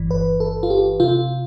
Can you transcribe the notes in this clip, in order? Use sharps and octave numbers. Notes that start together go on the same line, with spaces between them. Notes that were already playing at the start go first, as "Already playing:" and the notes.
Already playing: G1 G2 E3
B4
A4
F4
G4
C3 F4